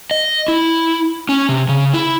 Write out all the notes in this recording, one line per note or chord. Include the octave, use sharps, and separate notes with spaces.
D#5
E4
C#4
C3
C#3
E4